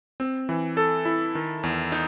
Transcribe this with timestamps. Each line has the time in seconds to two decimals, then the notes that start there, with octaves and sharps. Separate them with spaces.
0.20 C4
0.49 E3
0.77 A4
1.05 E4
1.35 D#3
1.63 E2
1.92 D#4